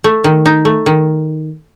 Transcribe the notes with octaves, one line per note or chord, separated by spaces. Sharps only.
A3
D#3
D#4
A3
D#3